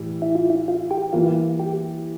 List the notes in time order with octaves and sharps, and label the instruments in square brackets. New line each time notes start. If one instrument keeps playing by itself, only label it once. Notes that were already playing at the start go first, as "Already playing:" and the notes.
Already playing: [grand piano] A2 E3 G3
[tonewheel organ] E4
F4
E4
F4
G4
[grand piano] E3 G3 A#3 E4 [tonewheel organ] F4
[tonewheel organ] G4